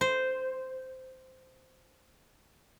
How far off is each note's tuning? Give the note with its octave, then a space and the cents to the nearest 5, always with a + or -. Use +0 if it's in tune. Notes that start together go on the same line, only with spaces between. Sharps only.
C5 -10